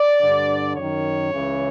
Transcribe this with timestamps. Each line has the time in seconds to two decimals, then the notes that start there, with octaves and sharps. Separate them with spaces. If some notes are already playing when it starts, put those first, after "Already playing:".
Already playing: D5
0.19 G2 D3
0.75 F#2 D#3 C#5
1.32 C#2 C#3 E3